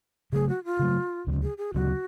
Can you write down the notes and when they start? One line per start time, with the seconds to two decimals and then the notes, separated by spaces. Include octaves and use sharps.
0.32 C#3 F#3 A3 G#4
0.49 F#4
0.65 F4
0.79 C#3 F#3 A3
1.27 D2 C#3 F#3
1.43 G#4
1.58 G#4
1.75 D2 C#3 F#3 F#4